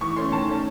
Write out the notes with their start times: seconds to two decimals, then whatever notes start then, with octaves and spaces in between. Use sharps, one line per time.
0.01 E3 C#6
0.16 A3 C#4 C6
0.32 D#3 A5
0.48 A3 C#4